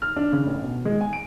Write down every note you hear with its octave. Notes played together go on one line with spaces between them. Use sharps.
F6
D4
C#3
A1
B2
G#3
G#5
D7